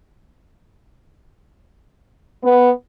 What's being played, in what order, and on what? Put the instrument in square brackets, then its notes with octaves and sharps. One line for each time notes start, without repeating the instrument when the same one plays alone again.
[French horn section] B3